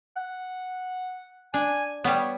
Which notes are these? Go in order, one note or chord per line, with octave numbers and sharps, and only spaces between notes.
F#5
D4 G#5
G3 B3 C#5